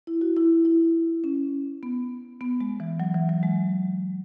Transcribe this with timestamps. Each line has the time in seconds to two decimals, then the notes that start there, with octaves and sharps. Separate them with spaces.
0.07 E4
0.21 F#4
0.36 E4
0.65 E4
1.24 C#4
1.83 B3
2.41 B3
2.61 G#3
2.80 E3
3.00 F#3
3.14 E3
3.29 F#3
3.43 G#3